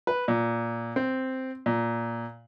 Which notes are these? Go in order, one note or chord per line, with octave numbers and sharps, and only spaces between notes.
B4
A#2
C4
A#2